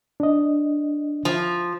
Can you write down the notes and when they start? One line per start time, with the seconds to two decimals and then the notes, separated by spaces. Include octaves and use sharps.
0.20 D4 D#5
1.25 F3